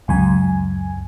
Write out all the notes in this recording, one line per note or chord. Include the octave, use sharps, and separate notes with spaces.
C#2 F#2 G#5